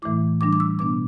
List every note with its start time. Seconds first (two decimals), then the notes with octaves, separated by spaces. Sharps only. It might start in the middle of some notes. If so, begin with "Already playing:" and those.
0.02 A2 E3 A3 E4 D6
0.41 E3 G3 D4 D6
0.53 D6
0.60 E6
0.79 B2 B3 D4 D6